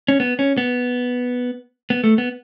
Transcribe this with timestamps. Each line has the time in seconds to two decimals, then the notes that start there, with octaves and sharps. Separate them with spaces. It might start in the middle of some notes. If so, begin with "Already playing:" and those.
0.08 C#4
0.20 B3
0.39 C#4
0.58 B3
1.90 B3
2.04 A3
2.18 B3